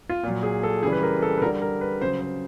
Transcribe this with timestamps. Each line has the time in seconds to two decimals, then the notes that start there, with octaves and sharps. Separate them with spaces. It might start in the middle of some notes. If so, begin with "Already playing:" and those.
0.09 F4
0.24 A#2 F#3
0.43 G#4
0.63 A4
0.83 C#3 E3 G3 G#4
0.92 B4
1.03 A#4
1.22 A4
1.38 B4
1.42 D3 A#4
1.46 G3
1.62 A#4
1.81 B4
2.01 C#3 F#3 C5
2.21 C5